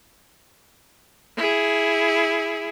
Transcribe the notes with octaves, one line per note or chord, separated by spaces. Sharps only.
E4 G#4